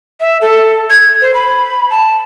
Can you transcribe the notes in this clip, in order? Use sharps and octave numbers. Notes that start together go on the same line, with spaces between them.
E5
A4
G#6
C5
B5
A5